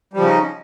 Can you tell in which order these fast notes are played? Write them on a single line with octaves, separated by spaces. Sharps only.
G3 F3 C#3 C#4 D#4